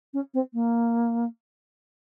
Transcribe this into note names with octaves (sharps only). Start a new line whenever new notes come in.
C#4
C4
A#3